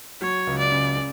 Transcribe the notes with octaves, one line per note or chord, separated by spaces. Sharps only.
F#3 C#5
C#2
D5
C#3
C#3